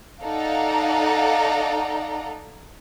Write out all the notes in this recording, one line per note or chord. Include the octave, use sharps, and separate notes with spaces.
D#4 A4 D5 F5 F#5 A#5